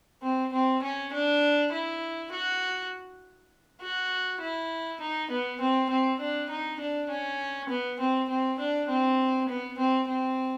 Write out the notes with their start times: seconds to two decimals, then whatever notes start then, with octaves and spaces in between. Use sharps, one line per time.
0.23 C4
0.53 C4
0.83 C#4
1.13 D4
1.72 E4
2.32 F#4
3.81 F#4
4.41 E4
5.00 D#4
5.30 B3
5.60 C4
5.90 C4
6.20 D4
6.50 D#4
6.80 D4
7.09 C#4
7.69 B3
7.99 C4
8.29 C4
8.59 D4
8.89 C4
9.48 B3
9.78 C4
10.08 C4